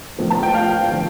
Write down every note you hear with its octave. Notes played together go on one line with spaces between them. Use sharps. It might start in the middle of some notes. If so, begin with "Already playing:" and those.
A#1 A2 F3
A5
G5
F5
D3 F3